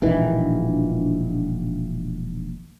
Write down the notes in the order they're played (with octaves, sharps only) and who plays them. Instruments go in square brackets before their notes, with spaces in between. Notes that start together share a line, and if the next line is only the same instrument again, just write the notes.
[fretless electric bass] E1 A#1 D#3 E3